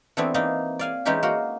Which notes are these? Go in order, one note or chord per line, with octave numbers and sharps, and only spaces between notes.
E3 A3 B3 C4 D4 E4
E3 A#3 D#4
D5 F5 G#5
E3 G#3 C#4 D#4 G4 G#4
A#3 F#4 A#4